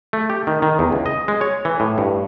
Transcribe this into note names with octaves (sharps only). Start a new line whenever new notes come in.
A3
G4
D#3
D#3
E2
C#2
D#5
G#3
C#5
E3
A2
G2